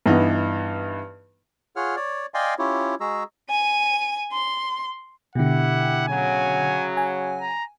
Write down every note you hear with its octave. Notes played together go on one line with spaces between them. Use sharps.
G2 E3 B3 D#4
F4 G#4 C#5 F#5 F6
C#5 D5
D5 D#5 F5 G5 G#5 C6
C#4 E4 F4 G4 C#5
G#3 F#4 G#4 A#5 E6
G#5 D#7
C6
B2 D3 E4 G4 F#5
C#3 F#3 G#5
G#5
A#5